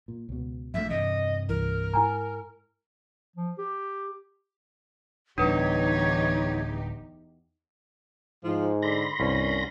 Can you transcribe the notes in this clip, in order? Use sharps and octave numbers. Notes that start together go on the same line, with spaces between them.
A#2
C#2 B2
A#1 F2 F#3 A3 E5
E2 G2 C3 D#5
C2 E3 A#4
G#2 E4 G#5 A#5
F3
G4
D1 E2 G3 D4 D#4 G4 B4 C#5
G#2 F3
D3 B5 C6 A#6
C2 G2 C#4